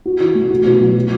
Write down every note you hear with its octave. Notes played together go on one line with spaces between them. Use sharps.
F#4
E3
A3
F#4
B2
F#3
F#3